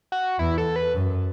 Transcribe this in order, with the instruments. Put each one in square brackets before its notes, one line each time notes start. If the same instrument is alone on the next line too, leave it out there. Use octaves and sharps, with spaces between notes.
[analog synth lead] F#4
[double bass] E2 [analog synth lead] E4
[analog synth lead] A4
B4
[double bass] F#2